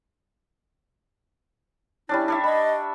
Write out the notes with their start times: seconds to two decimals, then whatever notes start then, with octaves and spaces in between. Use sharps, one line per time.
2.09 G3 C#4 D4 E4
2.28 D4 C#5 E5
2.44 D#5 B5